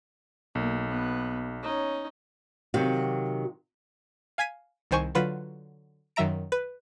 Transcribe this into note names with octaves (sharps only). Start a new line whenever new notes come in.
B1 A#3
B3
C#4 D#4
C3 D#3 F#3 F#4 F5
F5 G#5 G#6 B6 D#7
C2 D#3 C5 G#5 C#6
D3 F#3 F4 B4
F#2 D#3 F#3 E5 A#5 D7
B4